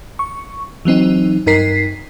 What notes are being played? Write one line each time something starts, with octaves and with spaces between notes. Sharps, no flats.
C#6
E3 F#3 C4 D#4
G2 D#4 A#4 B6 C7